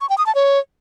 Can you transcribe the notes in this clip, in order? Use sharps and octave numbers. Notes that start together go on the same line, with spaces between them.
C#6
G5
D#6
A5
C#5